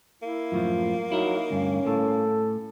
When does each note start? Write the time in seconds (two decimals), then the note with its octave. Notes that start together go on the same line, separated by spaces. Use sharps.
0.22 A#3 E4
0.52 F#2 A2 F3 F4
1.12 F#3 D#4 E4 A#4
1.50 D2 G2 C#4
1.87 A2 A4